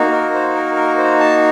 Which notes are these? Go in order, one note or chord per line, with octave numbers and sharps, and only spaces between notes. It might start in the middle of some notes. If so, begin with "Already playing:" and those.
Already playing: A#3 D#4 F#4
A#4
C5
A#4
A#4
C5
A5